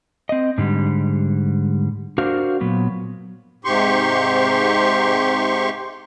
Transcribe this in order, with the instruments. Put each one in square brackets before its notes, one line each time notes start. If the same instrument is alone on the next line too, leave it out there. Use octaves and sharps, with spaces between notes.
[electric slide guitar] C4 D#5
G#2 D3 G3
D4 F#4 A#4 C5 F5
A#2 F#3 B3
[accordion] G#2 C3 G4 C6 C#6